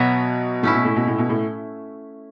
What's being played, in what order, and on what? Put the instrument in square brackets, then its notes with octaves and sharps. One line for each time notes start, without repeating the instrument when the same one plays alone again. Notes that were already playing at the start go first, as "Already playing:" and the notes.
Already playing: [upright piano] B2 [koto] F#3 B3 F#4 C#5 E5
[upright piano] A2 [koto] A3 C#4 E4
[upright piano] B2
A2
B2
A2
B2
A2